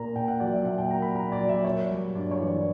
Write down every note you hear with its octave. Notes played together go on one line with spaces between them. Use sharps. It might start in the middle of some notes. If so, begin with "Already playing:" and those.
Already playing: A#2 A#3 A#5
A#2 G5
F#5
F#3 D5
E5
A#2 F#5
G5
A#3 A#5
B5
A#2 A#5
D5
F#3
E5
A#3 C#5
G3
G2 D5
C#5
E3
D5